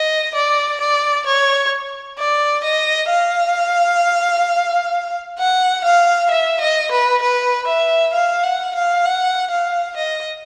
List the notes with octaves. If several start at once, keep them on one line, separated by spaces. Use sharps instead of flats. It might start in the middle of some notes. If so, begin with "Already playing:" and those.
Already playing: D#5
D5
D5
C#5
D5
D#5
F5
F#5
F5
E5
D#5
B4
B4
E5
F5
F#5
F5
F#5
F5
D#5